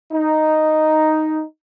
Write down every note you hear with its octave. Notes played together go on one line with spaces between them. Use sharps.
D#4